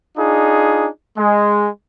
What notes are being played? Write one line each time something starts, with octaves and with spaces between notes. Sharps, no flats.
D4 D#4 F4 G#4
G#3